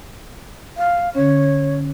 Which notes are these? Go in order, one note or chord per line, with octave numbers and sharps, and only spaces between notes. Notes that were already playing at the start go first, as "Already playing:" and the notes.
F5
D3 C#4 C#5